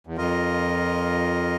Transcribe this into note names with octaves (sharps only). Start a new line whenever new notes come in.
E2
F2 F4 A#4 D#5